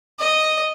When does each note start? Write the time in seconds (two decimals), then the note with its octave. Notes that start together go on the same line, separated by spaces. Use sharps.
0.20 D#5